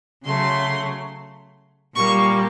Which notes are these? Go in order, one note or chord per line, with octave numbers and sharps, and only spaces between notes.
C#3 F#3 A3 C6
A#2 G3 A#3 C#6